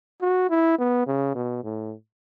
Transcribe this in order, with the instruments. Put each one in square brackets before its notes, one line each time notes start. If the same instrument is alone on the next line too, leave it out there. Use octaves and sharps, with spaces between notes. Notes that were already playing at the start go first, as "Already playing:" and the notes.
[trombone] F#4
E4
B3
C#3
B2
A2